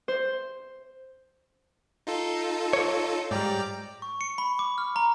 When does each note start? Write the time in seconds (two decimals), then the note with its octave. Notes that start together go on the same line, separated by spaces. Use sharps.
0.08 C5
2.07 D#4 F4 A4
2.73 C#5
3.31 G#2 G3 D5 G5 A#5
4.02 C#6
4.21 C#7
4.38 B5
4.59 D6
4.78 F6
4.96 A#5